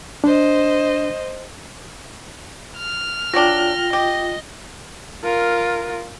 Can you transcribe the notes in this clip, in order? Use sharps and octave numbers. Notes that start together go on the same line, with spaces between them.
D4 C5 D#5
F6
F#3 G3 D4 F4 G5 A#6 G7
G4 D#5
F4 A#4